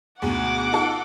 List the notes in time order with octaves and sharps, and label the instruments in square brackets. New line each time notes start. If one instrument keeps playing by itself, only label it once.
[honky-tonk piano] D2 G#2 B2 [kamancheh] F#5 D6
[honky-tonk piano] D#4 F4 A4